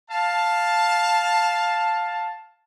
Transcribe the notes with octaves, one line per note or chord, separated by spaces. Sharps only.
F5 A5